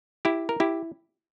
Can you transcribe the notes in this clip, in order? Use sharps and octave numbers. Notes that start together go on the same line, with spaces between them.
E4 G4
A#4
E4 G4